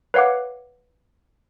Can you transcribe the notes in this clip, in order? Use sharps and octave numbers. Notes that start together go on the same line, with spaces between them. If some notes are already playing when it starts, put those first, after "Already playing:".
B4 C#5 F5 F#5 D6